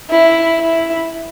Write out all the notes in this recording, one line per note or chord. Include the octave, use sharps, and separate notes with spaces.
E4
E4